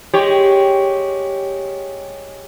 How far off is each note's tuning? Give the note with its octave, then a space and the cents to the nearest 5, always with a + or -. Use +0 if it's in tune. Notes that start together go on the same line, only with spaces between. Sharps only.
G#3 +0 G4 +0 C#5 +0